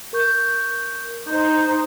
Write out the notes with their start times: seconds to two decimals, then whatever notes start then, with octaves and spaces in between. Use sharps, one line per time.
0.13 A#4 C#6 G6
1.27 D#4 C5 G6